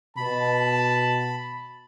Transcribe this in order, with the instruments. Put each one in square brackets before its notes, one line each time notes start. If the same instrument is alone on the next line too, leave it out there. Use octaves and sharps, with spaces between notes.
[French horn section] B2 [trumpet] A5 [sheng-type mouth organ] B5